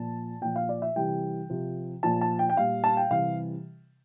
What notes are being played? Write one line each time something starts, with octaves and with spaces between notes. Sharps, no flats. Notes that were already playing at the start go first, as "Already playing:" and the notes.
Already playing: A#2 F3 A5
A#2 F3 G5
F5
D5
E5
C3 E3 G3 G5
C3 F3
A#2 F3 A5
A5
G5
G5
A#2 G3 F5
A5
G5
C3 E3 G3 F5